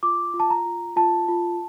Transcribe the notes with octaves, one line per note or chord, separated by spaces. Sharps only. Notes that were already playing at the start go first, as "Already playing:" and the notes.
F4 D6
F4
A5
A#5
F4
F4 A5
F4